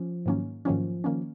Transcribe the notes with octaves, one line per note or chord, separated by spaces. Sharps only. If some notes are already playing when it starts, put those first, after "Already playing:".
Already playing: F3 C#4
G#2 D#3 F#3 A#3 C#4
G#2 D#3 F3 F#3 A#3 C#4
D#3 A#3 C#4